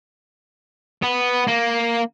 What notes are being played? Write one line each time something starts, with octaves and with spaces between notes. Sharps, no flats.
B3
A#3